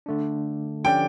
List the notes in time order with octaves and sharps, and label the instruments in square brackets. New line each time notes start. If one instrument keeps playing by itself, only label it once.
[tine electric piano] D3 A3 D4
[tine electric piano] D3 F3 C#4 G4 D5 [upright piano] G5